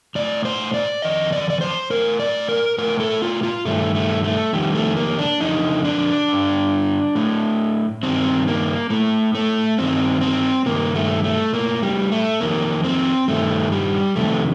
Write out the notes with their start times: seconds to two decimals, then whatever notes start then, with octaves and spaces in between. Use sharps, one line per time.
0.15 A2 D5
0.45 C5
0.74 D5
1.02 F2 D#3 D#5
1.32 D5
1.50 D5
1.61 C5
1.90 A2 A#4
2.20 D5
2.49 A#4
2.78 A2 A#4
3.00 A4
3.22 F4
3.43 F4
3.65 G2 D#3 A3
3.95 A3
4.24 A3
4.53 F2 D#3 G3
4.75 A3
4.97 A#3
5.18 D4
5.40 F2 D3 D#4
5.84 D4
6.28 G2 D3
7.15 A2
8.03 G2 D#3 C4
8.47 A#3
8.90 A2 A3
9.35 A3
9.79 G2 D#3 C4
10.21 C4
10.66 G2 D#3 A#3
10.95 A3
11.24 A3
11.53 A2 A#3
11.83 G3
12.12 A3
12.41 F2 D#3 A#3
12.84 C4
13.28 G2 D#3 A3
13.72 G3
14.16 F2 C3 D#3 A3